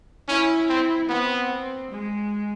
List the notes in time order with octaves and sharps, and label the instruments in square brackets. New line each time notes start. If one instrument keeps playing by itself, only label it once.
[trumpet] C#4 [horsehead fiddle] E4
[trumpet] C4
[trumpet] B3 [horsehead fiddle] C4
[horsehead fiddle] G#3